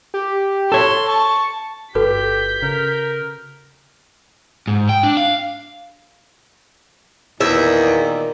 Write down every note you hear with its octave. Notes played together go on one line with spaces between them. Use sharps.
G4
A4 C#5 C6
A5 C#6
G1 F#4 G4 A4 B4 G6 B6
C#3 A#4
G#2
G5
D4
F5
E2 A#2 D#3 E5